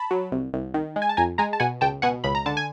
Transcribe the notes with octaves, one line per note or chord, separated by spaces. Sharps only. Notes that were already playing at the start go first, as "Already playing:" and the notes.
Already playing: A5 B5
F#3
C2
C2
D#3
G#3
G#5
A5
F2 G#5 A#5
G#3 G#5 A#5
A5
B2 F#5 G#5
C#2 G5 A5
B2 F#5 G#5
C#2 B5
A#5
D3 A5
G#5